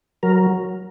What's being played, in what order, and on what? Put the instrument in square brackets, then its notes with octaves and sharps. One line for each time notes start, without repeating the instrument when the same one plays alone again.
[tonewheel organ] F#3 A#4